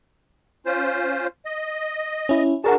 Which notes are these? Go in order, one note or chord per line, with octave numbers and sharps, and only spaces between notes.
C#4 F4 C5
D#5
C#4 E4
D4 F#4 G#4 A#4 F#5 A5